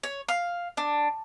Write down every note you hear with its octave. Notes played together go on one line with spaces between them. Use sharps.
C#5
F5
D4